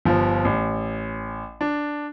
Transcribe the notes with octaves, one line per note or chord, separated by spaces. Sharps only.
G1 F3
A1
D4